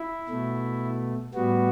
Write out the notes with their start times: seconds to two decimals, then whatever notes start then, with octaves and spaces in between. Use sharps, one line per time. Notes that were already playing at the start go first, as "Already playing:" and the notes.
Already playing: E4
0.28 B2 A3
1.34 A2 G3 B3 F#4